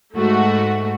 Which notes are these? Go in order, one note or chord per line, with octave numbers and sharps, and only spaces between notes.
G#2 A3 F#4